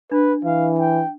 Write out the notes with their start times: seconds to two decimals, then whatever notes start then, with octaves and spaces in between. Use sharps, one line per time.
0.12 D4 B4
0.45 E3 F5
0.79 G5